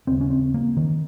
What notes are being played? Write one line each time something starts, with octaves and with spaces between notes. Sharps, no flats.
D#2 C#3 C4
C#4
C4
A#3
D#3